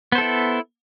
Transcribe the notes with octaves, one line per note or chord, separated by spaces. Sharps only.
B3 E4 A4 C5